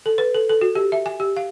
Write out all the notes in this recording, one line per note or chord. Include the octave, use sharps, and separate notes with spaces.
A4
B4
A4
A4
F#4
G4
E5
G#5
G4
F5